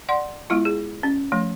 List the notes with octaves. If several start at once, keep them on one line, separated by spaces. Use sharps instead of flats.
D5 F#5 C6
G#3 B3 E4 F4
G#4
C#4
F3 A3